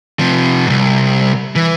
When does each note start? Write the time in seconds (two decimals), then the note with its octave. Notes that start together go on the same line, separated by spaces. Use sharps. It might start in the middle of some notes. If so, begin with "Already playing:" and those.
0.19 C3 F3
0.66 C2 G#2
1.56 E3